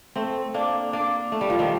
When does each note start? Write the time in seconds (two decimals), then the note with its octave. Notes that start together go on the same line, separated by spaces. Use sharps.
0.16 A3 C4
0.54 A#3 D4
0.93 A#3 D4
1.32 A3
1.41 G3
1.50 F3
1.59 D#3 G3